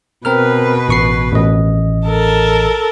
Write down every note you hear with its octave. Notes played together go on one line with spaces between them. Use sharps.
B2 C4 A#4 B4 F6
A1 C#6 C7
A1 D#5
A4 A#4 A5